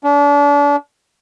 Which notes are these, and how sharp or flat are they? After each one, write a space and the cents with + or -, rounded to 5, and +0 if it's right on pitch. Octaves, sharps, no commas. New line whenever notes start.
D4 -35